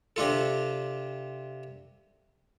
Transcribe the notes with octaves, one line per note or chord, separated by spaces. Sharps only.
C3 D4 F4 A4